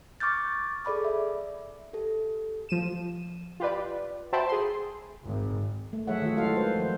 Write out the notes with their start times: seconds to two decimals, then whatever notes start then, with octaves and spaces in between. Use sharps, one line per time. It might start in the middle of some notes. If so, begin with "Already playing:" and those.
0.20 C#6 D6 F6 G6 A6
0.85 G#4 A4 D5 B5 D6
1.05 E5
1.93 G4 A4
2.69 F3 D#7 E7
3.60 F4 G4 B4 D5
4.33 F#4 C5 E5 G5 A5 B5
4.48 G#4 C6
5.25 G#1
5.93 A3
6.07 F#3 A3 G#4 C#5 E5 F#5
6.22 D#3 A3 F4
6.36 D#3 G#3 E4 F#4 A4 F5
6.56 B4 C5
6.76 F3 C5